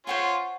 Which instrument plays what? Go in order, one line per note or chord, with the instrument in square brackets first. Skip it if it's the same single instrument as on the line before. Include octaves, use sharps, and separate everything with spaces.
[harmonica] C#4 F4 [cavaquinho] C5 F#5 C#6